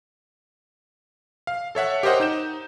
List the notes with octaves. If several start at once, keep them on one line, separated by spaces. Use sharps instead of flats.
F5
A4 C#5 E5 F#5
G4 A#4 C5 D#5 F#5
D#4 G6 E7